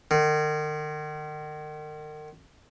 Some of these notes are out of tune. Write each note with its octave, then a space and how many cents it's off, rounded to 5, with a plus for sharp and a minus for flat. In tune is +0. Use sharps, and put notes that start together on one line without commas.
D#3 -40